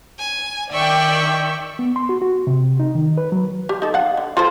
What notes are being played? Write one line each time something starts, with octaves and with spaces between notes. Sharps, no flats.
G#5
D#3 D5 E5 G5 C#6
B3
C6
F#4
F#4
C3
D#4
D#3
B4
F#3
G4
D#4 A4
F5 F#5
D3
F4 A4 C5